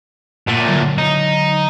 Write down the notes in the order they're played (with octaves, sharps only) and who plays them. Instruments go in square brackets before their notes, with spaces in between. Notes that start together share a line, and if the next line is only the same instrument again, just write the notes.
[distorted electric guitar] A#2 A3 [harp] F#5 D#7 E7
[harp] D3 F#3 G#3
[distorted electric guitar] D#4